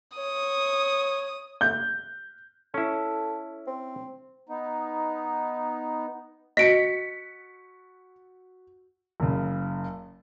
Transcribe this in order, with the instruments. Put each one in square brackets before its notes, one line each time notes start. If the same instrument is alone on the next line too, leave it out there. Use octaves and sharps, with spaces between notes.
[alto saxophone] C#5 [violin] D#6
[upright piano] G6
[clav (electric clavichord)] C#4 E4 [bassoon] A4
[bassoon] C4
[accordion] B3 D#4
[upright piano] F#4 [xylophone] D#5 D7 [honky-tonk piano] B6 C#7
[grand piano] F#1 C#3